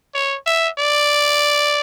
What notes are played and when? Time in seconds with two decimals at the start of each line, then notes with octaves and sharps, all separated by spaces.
0.15 C#5
0.47 E5
0.79 D5